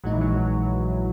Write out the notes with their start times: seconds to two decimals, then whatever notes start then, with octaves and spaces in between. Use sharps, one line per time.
0.04 A#1 A#2 F#3 G#3 D#4
0.12 E3
0.21 F#3